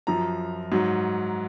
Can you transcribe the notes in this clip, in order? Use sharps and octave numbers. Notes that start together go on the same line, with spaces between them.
F#2 F3 A#5
G#2 F#3